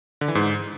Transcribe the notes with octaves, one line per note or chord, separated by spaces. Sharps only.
D3
E3
G#2